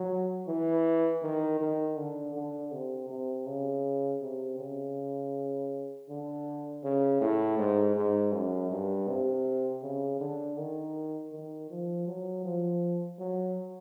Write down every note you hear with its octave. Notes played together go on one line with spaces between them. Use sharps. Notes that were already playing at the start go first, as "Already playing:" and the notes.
Already playing: F#3
E3
D#3
D#3
D3
D3
C3
C3
C#3
C3
C#3
D3
C#3
A2
G#2
G#2
F#2
G2
C3
C#3
D3
D#3
D#3
F3
F#3
F3
F#3